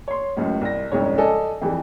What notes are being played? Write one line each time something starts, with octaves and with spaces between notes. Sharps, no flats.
C#5 C6
C#2 F#2 A2
C2 A#6
C2 F2 G#2 C#3 C#5
A4 D5 D#5 G#5
F2 E3 G3